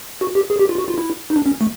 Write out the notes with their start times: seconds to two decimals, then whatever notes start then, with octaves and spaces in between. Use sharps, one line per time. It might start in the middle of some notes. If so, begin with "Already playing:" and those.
0.21 F#4
0.35 G4
0.50 G#4
0.59 G4
0.69 F4
0.78 F#4
0.88 F4
0.98 E4
1.30 D#4
1.36 D4
1.46 C#4
1.61 A3